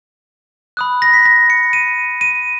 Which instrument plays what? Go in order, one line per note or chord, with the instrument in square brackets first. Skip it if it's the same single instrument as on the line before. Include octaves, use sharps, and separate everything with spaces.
[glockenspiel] B5 D#6 F#6
A#6
B6
A#6
C#7
D#7
D#7